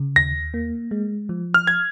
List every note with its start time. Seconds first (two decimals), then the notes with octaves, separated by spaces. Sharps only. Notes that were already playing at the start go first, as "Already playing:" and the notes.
Already playing: C#3
0.16 D#2 A#6
0.54 A#3
0.91 G#3
1.29 F3
1.54 F6
1.67 G#6